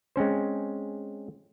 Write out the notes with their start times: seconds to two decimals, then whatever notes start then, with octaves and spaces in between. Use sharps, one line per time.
0.16 G#3 C4 C#4 C5